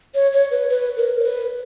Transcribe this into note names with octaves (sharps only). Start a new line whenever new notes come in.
C#5
C#5
B4
B4
A#4
C#5
B4